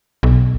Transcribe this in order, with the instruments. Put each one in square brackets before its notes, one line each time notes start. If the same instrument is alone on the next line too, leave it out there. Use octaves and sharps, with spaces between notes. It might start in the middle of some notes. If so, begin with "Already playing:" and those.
[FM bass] B1